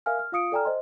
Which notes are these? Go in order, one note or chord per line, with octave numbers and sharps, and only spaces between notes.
A#4 E5 F5 G#5 F6
F6
F4 F5 D#6 C#7 D7
A4 D5 G5 G#5 A#5 F6
C5 D#5 C6